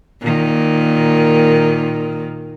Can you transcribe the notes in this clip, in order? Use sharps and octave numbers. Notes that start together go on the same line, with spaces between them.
A#2 D#3